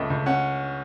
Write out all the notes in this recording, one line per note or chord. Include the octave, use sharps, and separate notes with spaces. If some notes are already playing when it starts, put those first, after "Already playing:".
Already playing: C#2 A3
C#2
C#4 F#5